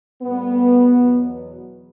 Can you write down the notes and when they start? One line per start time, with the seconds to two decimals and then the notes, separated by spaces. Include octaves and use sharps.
0.23 A2 G3 B3
0.95 E2 B2 F#3